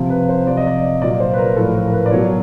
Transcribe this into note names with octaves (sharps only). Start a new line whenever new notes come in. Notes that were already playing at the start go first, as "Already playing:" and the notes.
Already playing: C3 F3
B4
C5
C3 F3 D5
D#5
D5
A#2 F#3 D5
C5
B4
A#4
A2 F3 A4
A#4
A#4
B4
D5
B2 F#3 C#5